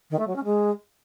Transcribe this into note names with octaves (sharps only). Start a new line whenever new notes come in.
D#3
A3
F#3
C#4
G#3